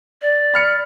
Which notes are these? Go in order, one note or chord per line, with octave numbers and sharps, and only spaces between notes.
D5
B5 F6 C#7